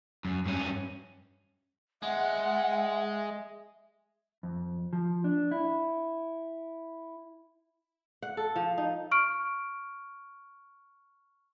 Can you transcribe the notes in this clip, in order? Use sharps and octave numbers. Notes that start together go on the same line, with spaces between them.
F#2
G2 C#4
G#3 E5 F#5
F2
F3
D4
E4
F#5
A4
F3
D#4
C#6 F6 D7